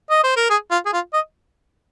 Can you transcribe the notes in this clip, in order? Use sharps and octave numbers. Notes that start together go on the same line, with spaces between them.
D#5
C5
A#4
G#4
F4
G#4
F4
D#5